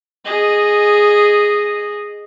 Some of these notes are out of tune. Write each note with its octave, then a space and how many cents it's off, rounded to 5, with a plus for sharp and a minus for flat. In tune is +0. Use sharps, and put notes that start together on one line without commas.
G#4 +0 D#5 -10